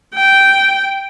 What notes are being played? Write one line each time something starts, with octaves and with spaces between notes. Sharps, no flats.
G5